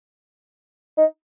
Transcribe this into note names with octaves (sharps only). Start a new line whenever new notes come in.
D#4